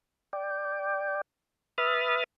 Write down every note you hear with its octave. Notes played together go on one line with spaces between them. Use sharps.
D5 G5
B4 E5 B5 D#6 F6 A6